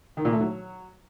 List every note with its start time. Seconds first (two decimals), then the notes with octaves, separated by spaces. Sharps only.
0.17 D#3
0.25 A#2
0.33 A3
0.40 F#3